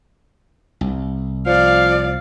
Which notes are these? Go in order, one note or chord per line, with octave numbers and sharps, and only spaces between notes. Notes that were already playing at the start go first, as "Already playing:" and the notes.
C2
F3 D5 F5